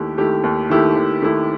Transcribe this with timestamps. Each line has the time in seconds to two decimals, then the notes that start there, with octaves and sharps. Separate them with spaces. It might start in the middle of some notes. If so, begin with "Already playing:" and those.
Already playing: D#2 D#3 A3 E4 G4
0.18 D#3 A3 E4 G4
0.44 D#2
0.70 D#3 A3 E4 G4
0.96 D#2
1.22 D#3 A3 E4 G4